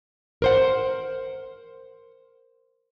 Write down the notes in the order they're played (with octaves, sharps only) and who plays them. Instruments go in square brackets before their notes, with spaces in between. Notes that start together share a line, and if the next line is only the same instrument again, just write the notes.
[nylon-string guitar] A#4 C5 F#5